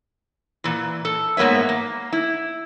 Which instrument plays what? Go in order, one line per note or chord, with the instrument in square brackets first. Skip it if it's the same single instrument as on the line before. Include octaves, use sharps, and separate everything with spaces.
[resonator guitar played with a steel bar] A#2 E3
A4
G#2 A#3 B3 C#5 E5
A#3
E4